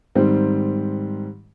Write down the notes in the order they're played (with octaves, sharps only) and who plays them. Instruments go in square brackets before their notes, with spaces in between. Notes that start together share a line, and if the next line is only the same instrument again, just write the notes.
[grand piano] G#2 D#3 G3 C4